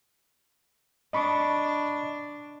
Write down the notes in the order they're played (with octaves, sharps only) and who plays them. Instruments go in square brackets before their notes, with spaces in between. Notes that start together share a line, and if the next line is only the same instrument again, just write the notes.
[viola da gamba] D4 [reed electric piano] D#5 B5 C#6